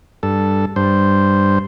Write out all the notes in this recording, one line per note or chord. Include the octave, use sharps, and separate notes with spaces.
G2 A4
G2 C5